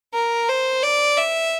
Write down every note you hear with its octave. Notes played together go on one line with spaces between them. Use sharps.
A#4
C5
D5
E5